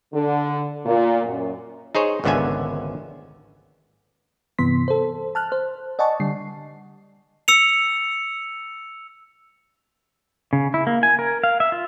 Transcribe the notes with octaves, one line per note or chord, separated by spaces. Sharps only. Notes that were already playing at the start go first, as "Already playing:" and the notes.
D3
A#2
F#2
D#4 G#4 C5 C#5
G#1 C#2 D3 B3 E5 G#5
G2 C3 E3 B3 C6 B6
A4 C5
A5 F6 F#6
C5
D5 D#5 F#5 G#5 A5 C#6
D3 G3 C7
E6 C#7 F7
C#3
E4
A#3
G#5
A#4
F5
E5
F4